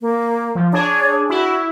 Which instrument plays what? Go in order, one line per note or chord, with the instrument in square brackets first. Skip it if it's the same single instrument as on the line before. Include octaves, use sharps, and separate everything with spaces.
[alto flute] A#3
[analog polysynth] F3
[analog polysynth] D4 G#4 [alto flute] C#5
[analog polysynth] E4 [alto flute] F#4